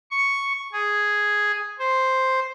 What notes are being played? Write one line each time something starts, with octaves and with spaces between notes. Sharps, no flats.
C#6
G#4
C5